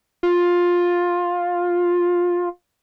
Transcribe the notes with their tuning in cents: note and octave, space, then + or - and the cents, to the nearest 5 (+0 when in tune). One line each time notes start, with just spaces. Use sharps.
F4 +10